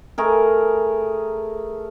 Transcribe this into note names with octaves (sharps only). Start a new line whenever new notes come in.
A3 G#4 A#4